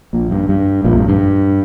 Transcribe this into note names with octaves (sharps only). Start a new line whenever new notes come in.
A#1 A#2
G2
G2
A#1 A#2
F2
G2
G2